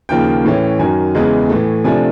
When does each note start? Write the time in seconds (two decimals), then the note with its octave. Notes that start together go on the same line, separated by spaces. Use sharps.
0.09 D#2 C#3 F3 A#3 G5
0.45 A2 E3 A3 C#4
0.79 F#2 D#3 F#3 G#5
1.14 E2 C#3 E3 G#3 B3
1.49 A2 E3 A3
1.84 C3 F3 A3 D4 G#5